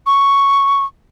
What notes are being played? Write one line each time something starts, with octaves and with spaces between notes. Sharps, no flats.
C#6